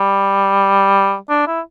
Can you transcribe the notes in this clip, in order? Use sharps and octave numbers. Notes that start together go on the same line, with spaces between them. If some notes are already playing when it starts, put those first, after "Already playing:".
Already playing: G3
D4
E4